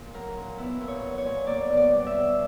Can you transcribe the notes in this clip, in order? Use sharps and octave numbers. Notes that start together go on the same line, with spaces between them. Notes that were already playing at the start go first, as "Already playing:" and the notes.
Already playing: A#2
F#3 A#4
A#2
B3 E4
A#2
C#5
F#3
C#5
A#2
A#3 D5
B2
D5
G3
E5
B2